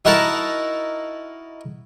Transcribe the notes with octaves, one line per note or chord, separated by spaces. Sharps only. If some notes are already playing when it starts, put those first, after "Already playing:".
D#4 E4 F#4 A#4 A5 A#5